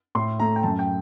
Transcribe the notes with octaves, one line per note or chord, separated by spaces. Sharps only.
A2 C6
A3 A#5
G5
F#2 A5
G5